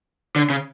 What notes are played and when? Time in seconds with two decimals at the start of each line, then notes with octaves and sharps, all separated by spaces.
0.36 D3
0.50 C#3